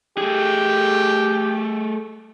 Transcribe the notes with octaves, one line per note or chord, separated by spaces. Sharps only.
A3 G4 G#4